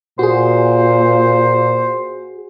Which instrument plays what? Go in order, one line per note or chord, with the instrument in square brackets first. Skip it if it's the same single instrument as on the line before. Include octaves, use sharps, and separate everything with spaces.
[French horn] A#2 [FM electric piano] F#4 G#4 [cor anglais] C5